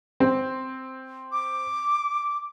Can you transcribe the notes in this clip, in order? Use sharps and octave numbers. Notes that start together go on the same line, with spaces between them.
C4
D6